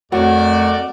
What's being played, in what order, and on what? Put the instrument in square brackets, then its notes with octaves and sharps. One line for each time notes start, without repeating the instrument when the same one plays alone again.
[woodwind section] F2 A3 [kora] F#3 [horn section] F#4 A#4 D5